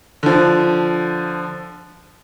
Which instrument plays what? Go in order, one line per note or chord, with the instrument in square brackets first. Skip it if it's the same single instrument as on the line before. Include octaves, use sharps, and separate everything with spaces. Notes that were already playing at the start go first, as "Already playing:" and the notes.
[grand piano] D3 F3